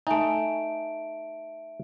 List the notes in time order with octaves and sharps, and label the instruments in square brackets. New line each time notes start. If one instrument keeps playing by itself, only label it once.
[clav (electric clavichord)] A3 D#4 [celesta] E5 D7 [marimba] G#5